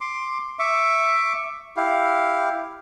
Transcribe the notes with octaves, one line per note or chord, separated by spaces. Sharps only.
C6 D6
E5 C#6 D6
E4 G4 F5